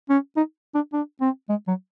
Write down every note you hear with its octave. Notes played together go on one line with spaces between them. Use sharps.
C#4
D#4
D4
D4
C4
G#3
F#3